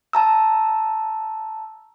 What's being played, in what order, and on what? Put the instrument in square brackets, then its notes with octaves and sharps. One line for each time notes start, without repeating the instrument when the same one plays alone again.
[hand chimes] A5 A#5 E6